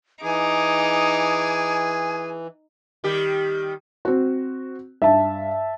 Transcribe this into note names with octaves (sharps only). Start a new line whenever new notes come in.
E3 D#4 G#4 G#5 D6
D#3 G3 G4
C4 F#4
G2 E5 A5